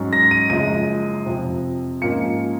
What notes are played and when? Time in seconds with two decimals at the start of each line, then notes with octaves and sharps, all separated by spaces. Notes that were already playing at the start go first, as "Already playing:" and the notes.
Already playing: G#2 F#3 C#4
0.13 A#6
0.31 D#7
0.50 F#1 F#2 F3 G#3 D#7
1.26 F2 C3 F3
2.01 G#2 F3 A#3 C#4 F4 C#7